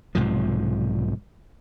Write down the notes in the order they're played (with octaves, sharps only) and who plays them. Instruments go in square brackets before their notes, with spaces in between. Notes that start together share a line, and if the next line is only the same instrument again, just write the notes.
[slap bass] B1 G#2 C3 F3